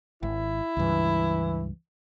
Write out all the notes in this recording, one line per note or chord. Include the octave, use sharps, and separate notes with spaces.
G#1 E4
C#2 G2 E3